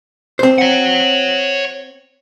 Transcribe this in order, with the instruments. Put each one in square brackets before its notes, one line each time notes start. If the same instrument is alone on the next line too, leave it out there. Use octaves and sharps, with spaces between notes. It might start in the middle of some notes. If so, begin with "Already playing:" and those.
[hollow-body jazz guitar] C4 C5
[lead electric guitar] C#5 F#5